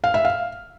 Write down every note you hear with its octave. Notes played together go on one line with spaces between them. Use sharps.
F5
E5
F5